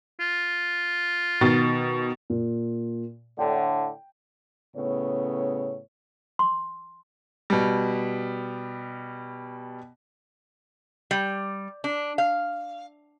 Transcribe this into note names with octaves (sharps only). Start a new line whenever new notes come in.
F4
B2 D#3 A6
A#2
A2 D3 G5
A2 C#3 B3 C#5
C6
B2 G3
G3
D4
F5